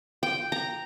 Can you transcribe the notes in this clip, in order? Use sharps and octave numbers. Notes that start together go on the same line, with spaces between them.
G5
A#5